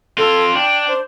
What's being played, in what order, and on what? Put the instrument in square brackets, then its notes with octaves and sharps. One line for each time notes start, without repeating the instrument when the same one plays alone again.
[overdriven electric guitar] C4 F4 [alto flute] A4
[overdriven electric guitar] D4 [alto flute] G5
[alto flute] C5